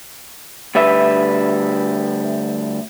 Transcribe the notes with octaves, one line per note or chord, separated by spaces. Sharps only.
D2 G3 B4 E5